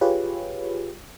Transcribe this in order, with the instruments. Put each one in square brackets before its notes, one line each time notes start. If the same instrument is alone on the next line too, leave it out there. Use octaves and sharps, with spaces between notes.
[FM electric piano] F4 G4 G#4 B4 C#5